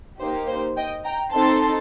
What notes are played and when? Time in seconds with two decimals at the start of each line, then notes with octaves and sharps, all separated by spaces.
0.20 A#3 D#4 G4 C5
0.49 C5
0.77 D#5 G5
1.05 G5 A#5
1.33 C4 D#4 A4 A5 C6